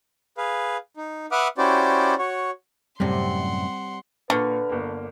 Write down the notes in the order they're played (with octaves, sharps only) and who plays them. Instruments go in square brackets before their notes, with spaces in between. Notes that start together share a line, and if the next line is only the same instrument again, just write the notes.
[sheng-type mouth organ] G#4 B4 F5
D#4
B4 E5 F#5 D6 D#6 F6
C#4 E4 F#4 G4 C5 D5
F#4 C#5
[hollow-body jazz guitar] F#2 A2 C3 [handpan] G3 C4 D5 [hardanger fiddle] F#5 C6
[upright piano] A#2 C#6 F6 [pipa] D3 [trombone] B4
[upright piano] G1 A#3